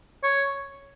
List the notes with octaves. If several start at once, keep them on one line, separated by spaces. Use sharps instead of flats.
C#5